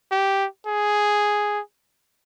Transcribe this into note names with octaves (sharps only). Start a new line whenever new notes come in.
G4
G#4